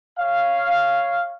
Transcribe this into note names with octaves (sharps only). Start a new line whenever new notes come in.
C#5 F5